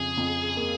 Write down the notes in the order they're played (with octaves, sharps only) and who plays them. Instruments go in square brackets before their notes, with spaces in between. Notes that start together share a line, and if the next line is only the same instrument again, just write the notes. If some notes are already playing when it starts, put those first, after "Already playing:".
Already playing: [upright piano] F2 C#3 [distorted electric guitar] G#4
[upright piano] F2
A#3